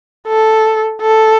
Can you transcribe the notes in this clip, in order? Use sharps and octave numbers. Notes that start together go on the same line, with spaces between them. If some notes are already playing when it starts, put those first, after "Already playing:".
A4
A4